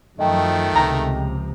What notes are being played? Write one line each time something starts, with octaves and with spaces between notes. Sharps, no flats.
F#2 D#3 F3 A3 D#5 G5
C#2 C3 F3 A#5